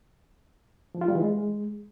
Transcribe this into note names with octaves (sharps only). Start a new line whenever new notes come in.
F3
F4
G3
E3
G#3